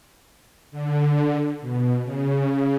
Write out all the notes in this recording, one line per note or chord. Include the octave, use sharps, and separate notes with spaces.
D3
B2
C#3